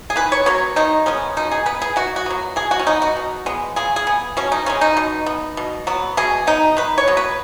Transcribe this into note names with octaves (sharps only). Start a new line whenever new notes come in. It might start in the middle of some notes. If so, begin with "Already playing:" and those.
G#4
D#3 B4
C#5
F#3 B3 C#5
D#3 D#4
G#3 B3 C#4
B2 D#4
G#4
B3 B4
G#4
D#3 F#4
F#4
F#3 B3
B2 G#4
F#4
C#4
B3 D#4
F#4
B2
G#3 B3
C#3 G#4
G#4
B3
B2 C#4
D#4
G#3 B3 C#4
D#4
B2
B3
B2
F#3 B3
B2 G#4
B3 D#4
D#3 B4
C#5
F#3 B3
B4